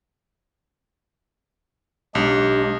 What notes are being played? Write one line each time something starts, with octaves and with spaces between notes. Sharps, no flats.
B1 G#3 D4 G4